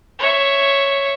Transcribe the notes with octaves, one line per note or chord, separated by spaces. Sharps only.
C#5 E5